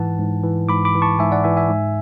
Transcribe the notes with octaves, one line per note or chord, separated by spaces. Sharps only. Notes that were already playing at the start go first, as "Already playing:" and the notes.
Already playing: G#2 E3 F#5 A5
G#2
E3
G#2 B5 D6
B5 D6
E3
A5 C#6
G#2 E5 G#5
D5 F#5
E3 E5 G#5
E5 G#5
G#2